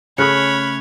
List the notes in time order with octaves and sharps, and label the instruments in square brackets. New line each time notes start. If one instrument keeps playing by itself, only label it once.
[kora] C#3 A3 G#4 [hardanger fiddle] C#5 [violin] B5 [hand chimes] F6 F#6 C#7